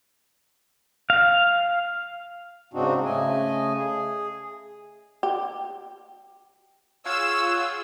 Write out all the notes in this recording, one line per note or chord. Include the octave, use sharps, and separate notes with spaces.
F5
G#2 C#3 C4 D4 D#4 F#4
C#3 A3 D#5 G#5
G#4
G4
F4 G#4 C#5 F5 F#5 E6